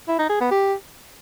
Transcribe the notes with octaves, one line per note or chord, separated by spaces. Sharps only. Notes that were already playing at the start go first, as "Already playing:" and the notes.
E4
D#4
G#4
B3
G4